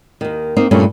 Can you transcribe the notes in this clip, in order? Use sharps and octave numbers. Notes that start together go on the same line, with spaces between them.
D#2 D#3
A#3 C4 D#4
G2 A#2 A3 C#4 E4